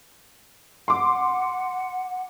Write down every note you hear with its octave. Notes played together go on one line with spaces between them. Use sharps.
F#5 C6 D6